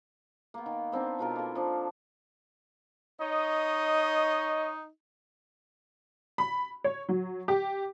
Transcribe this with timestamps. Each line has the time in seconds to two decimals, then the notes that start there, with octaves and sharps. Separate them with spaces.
0.54 A#3 B3
0.66 D#3
0.92 B3 C4 D4 D#4
1.19 B2 F4 A#4
1.36 A#3 A4
1.55 F3 D4
3.21 D#4 C#5 D#5
6.38 B5
6.84 C#5
7.09 F#3
7.48 G4